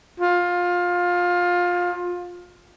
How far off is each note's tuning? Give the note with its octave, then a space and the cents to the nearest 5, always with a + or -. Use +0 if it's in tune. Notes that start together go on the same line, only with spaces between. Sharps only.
F4 +20